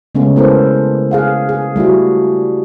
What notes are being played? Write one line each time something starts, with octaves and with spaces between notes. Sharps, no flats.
C#3 G#3 A3 B3 C#4
G#3 B3 E4 A4 A#4 C5
G#4 F5 F#5
G#4
G3 A3 E4 F#4